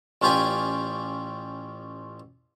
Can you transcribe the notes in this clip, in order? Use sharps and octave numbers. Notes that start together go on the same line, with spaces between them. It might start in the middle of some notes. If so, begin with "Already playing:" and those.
A1 C#4 F4 G4 D5 G#5